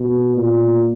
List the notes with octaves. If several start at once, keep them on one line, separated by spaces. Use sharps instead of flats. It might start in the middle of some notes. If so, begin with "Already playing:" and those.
Already playing: B2
A#2